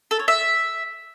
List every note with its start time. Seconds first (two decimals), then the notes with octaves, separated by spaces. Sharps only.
0.11 A4
0.19 C#5
0.28 E5